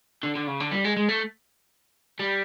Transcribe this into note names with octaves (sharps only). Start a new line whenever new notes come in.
D3
D3
C#3
D3
G3
G#3
G#3
A3
G3